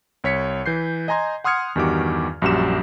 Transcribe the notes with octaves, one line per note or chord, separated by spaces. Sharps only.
C2 C#5 B6 C#7
E3 G6 C7
D#5 G#5 A#5 C6 G#6
F#5 C6 D#6 F6 G#6 C#7
E2 G2 D#3 F#4 G4 D6
A#1 F#2 G3 F#4 G4 E7